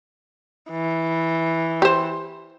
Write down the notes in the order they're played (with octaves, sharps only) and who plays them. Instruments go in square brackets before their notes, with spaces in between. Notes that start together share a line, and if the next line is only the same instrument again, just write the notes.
[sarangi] E3
[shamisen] G4 C5